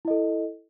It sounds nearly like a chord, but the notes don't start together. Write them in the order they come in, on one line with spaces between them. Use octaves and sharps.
E4 D#5 A4